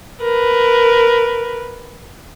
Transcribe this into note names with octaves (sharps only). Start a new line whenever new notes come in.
A#4 B4